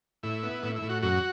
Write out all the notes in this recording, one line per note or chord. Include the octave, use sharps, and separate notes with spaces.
A2 E4
B3
A2 E4
E4
A2
F#4
F#2 F#4